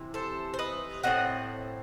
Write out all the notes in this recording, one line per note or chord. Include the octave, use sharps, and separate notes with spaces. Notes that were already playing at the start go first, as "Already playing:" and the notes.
Already playing: C3 E3
A4 C5
C5
B4 D#5
A2 G3 C4 D#5 F#5